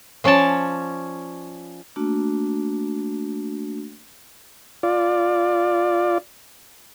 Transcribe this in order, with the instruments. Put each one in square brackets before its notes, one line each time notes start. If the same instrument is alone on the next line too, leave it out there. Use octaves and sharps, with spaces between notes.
[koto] F3 C#4 C#5 D5 A5
[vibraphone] A3 A#3 D4 F#4
[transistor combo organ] F4 D5